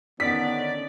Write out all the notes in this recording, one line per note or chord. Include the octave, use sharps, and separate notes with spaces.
D3 D#3 B3 C#4 D5 B6